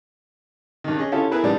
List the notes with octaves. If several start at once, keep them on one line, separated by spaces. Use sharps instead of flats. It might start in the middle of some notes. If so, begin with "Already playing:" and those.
G2 D#3
C#4 G#4 D#5
D3 C#4 E4 F4 G4 A4
B3 E4 G#4 A#4 B4
A1 G#2 G3 D5 A5